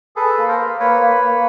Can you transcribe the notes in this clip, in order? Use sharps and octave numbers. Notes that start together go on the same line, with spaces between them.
G#4 A4 B4
A#3
A#4 C5
A#3
A#3 B4 C#5
A#3
A#3